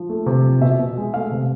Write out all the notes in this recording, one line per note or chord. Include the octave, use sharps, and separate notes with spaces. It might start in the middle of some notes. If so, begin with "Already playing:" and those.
Already playing: F3
A3
C3
F3
B2 E5
B2
G#3
A3 F5
C3